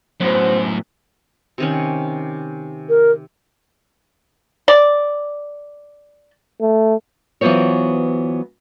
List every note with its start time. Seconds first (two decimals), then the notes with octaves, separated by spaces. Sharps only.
0.21 F#2 A2 F#3 B3 C5
1.58 C3 D#3 C#4
2.89 A#4
4.68 D5
6.61 A3
7.41 E3 F#3 B3 F4 C5 C#5